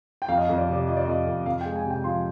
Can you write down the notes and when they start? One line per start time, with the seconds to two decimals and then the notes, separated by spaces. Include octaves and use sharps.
0.22 G5
0.28 F2 F5
0.38 D#5
0.44 F5
0.49 F2
0.58 D5
0.68 C3 D5
0.88 F3 D#5
0.97 D5
1.05 F2 D#5
1.27 F2
1.46 F2 F5
1.61 G5
1.66 G#3
1.76 G#5
1.86 C3 G5
2.04 F3 C6